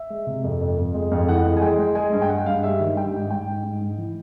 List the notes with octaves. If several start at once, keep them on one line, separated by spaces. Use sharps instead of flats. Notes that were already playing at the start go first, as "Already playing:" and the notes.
Already playing: E5
G#3
C3
F2
F2
F2
G#3
F2
E3 F#5
G#3
G#5
G#3 G5
G#3
G#3 G#5
G2 G#5
G5
G#3 F#5
G2 F5
G3 E5
D#3
G3 G5
G#2
G#2 G5
G#2
G#2
G#2
E3